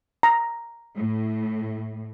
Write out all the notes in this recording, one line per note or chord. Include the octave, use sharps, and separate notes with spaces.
A#5
A2